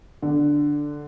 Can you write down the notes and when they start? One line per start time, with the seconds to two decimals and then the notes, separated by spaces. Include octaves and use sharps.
0.22 D3